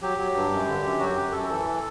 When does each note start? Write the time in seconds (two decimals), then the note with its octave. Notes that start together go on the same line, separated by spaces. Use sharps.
0.02 F#3 G4
0.18 F#3
0.35 G2
0.51 F#2
0.68 D3
0.83 F#2
0.99 F#3 F#4
1.16 F#2 G4
1.32 F#2 A4
1.49 E3 A4